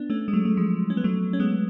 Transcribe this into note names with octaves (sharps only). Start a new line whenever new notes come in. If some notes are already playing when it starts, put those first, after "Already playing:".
Already playing: B3 D4
A3 C#4
G#3
F#3 A3
A3
F3 G#3
C#4
B3
F#3 A3
C#4
G#3 B3